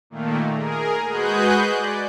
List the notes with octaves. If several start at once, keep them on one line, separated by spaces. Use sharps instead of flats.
A#2 D#3 A3 A#3
G#4 A#4
G#3 F#4 G#4 B4 F#6 G6
D5